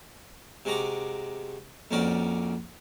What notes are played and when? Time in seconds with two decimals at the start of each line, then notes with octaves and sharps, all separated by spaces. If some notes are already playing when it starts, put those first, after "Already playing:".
0.65 C3 G#3 F#4 A#5 D6
1.91 A#1 F2 C#4 F#4 A#4 D5